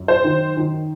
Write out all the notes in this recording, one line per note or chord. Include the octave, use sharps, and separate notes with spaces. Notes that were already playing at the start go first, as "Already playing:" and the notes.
Already playing: F#2
C5
D#3
D#3